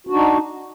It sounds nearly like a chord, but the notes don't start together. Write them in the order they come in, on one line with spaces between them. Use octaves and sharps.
F#4 D4 D#4